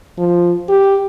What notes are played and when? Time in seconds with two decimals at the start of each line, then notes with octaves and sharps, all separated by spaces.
0.18 F3
0.68 G4